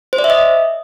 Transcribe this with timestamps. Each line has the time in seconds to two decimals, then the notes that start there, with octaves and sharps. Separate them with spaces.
0.13 C5
0.18 D5
0.24 E5
0.30 D#5